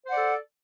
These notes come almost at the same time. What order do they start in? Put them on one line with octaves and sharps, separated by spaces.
C5 F#5 D5 A4